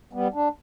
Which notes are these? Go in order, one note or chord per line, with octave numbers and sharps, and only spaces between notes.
G3 B3
D4